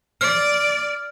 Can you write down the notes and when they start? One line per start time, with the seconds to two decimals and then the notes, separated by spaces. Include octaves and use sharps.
0.21 D5 F6